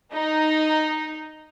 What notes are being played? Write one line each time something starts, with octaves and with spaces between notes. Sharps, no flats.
D#4